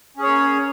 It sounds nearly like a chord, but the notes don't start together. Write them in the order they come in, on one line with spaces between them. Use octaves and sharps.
C#4 G#4 C#5 A#3